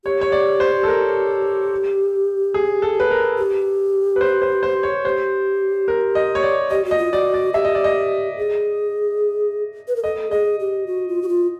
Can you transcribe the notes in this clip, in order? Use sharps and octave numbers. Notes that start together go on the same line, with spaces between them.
G4 C#5
C#5
D5
C5
A4
A#4
G#4
A4
B4
A#4
G4
B4
C5
C5
C5
C#5
G4 C5
A#4
D#5
C#5
D5
G4 D#5
F#4
D#5
F4
F#4 D5
D5
G4 E5
D#5
D5
D#5
G#4
B4
A#4
A4 D#5
G#4 D#5
G4
F#4
F4
F#4
F4